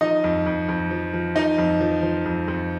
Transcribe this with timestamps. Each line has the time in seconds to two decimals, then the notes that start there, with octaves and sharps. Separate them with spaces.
0.01 F3 D#4 D#5
0.24 F2
0.46 F2
0.69 F2
0.91 F3
1.14 F3
1.35 F3 D#4 D#5
1.58 F2
1.81 F3
2.03 F3
2.26 F2
2.48 F2